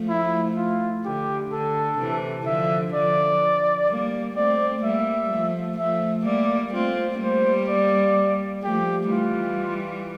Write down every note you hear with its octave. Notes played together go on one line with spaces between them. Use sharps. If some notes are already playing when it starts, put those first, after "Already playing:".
Already playing: F3 A3
E4
F4
D3 G4
D3 A4
C3 E3
D3 F3 E5
D3 F3 D5
G3 A#3
A3 C4 D5
G3 A#3 E5
F3 A3
F3 A3 E5
G3 A#3 D5
A3 C4 F4
G3 A#3 C5
D5
F3 A3 G4
E3 G3 F4